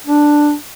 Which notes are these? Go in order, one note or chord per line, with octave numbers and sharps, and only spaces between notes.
D4